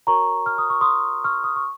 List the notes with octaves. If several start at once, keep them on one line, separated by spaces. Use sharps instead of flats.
F#4 A#4 C#5 A#5 C#6
F6
D#6
C#6
C6 D#6
C#6 F6
D#6
C#6